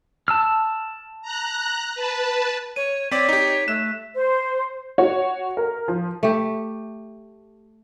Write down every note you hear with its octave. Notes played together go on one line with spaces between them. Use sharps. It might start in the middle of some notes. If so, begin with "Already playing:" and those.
A5 E6 F6
A#5 F#6
B4 A5
C#5 D#7
C4 C#5 D5 B6
D#4 G4 B6
A3 F#6 E7
C5
F#4 C#5
A#4
F3
A3 G4